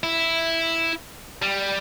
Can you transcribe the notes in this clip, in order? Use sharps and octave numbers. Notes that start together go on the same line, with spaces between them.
E4
G3